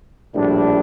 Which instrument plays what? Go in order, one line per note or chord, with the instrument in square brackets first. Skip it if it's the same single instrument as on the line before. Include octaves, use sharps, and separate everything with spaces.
[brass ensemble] A#1 A2 G3 D4